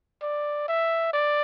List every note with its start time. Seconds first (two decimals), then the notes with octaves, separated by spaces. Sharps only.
0.22 D5
0.68 E5
1.13 D5